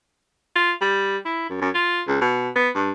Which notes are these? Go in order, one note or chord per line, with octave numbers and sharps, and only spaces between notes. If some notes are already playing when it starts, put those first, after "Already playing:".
F4
G3
E4
F#2
F#2
F4
C#2
B2
B3
G2